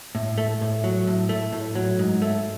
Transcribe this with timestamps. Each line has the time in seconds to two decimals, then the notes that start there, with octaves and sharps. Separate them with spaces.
0.15 A2
0.38 A3
0.61 A2
0.84 F#3
1.07 A2
1.29 A3
1.52 A2
1.75 F#3
1.99 G#2
2.22 A3